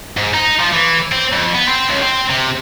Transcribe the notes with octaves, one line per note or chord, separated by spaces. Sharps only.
G#2
D#4
F3
E3
C4
F2
B3
C4
C#2
C4
C3